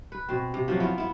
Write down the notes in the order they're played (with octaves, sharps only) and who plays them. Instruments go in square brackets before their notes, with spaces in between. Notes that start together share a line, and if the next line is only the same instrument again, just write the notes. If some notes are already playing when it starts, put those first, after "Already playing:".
[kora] B4
B2 C4
C3
F3 F#3 A#3
B3 E4 F4
B3 E4